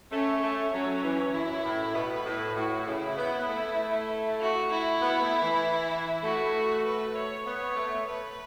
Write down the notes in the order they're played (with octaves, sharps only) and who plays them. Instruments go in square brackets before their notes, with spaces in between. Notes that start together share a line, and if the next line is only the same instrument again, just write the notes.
[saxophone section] A3 [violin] C#4
[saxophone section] A3
[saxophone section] F#3 [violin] C#4
[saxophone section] E3
[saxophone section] F#2 [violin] E4
[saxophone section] A2
[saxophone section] B2 [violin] B4
[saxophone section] A2
[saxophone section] A2 [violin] F#4
[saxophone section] C#3 [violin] E4
[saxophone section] B3
B3
A3
[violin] F#4
E4
[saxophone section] B3
A3
E3
[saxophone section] A3 [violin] F#4
[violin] B4
C#5
[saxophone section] B3 [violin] C#5
[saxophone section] A3
[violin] B4